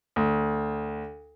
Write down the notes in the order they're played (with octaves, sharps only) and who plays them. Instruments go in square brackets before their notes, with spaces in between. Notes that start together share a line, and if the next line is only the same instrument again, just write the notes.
[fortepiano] D2